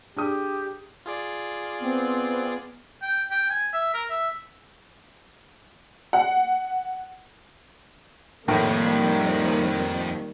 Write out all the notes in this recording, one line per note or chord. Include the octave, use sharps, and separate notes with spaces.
D4 G4 G#4 D#6
F4 G#4 D5
B3 C4
G5
G5
G#5
E5
A#4
E5
F#5
F2 A2 D#3 G3 A#3 A#4